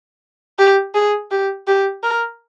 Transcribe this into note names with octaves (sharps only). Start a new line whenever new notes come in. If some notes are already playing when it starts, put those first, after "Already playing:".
G4
G#4
G4
G4
A#4